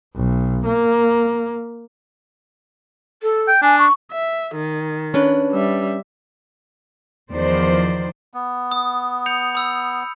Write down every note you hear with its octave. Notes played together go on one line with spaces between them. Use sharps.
B1
A#3
A4
G5
D4 G#5
C#6
E5
D#3
C#4 D4 B4
G3 E5
E2 D#3 F3 C5 D5
B3
D#6
G6 C#7 F7
B5 E6